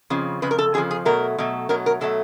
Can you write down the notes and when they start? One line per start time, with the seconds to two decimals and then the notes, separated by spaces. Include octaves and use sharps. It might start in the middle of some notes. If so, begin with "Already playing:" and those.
0.10 F2 C#3 F3
0.42 F2 C#3 B4
0.51 A#4
0.58 A4
0.74 F2 C#3 F3 G#4
0.91 G#4
1.05 B2 F#3 A3 A#4
1.38 B2 F#3 A3
1.69 B2 F#3 A3 A#4
1.86 A#4
2.01 B2 F#3 A3 A4